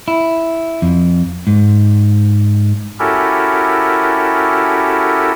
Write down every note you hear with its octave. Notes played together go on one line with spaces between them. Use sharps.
E4
F2
G#2
C#4 E4 F#4 G4 A4 A#4